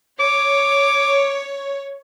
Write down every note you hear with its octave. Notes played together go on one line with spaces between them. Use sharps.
C#5 D6